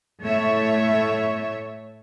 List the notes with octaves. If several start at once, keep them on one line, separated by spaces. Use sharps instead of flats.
A2 A3 C#5 E5